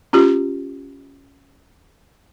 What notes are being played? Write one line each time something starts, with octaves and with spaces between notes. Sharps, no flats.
C#4 F4 G4